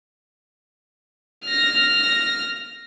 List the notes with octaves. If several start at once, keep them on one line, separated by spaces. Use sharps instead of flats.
F6 A#6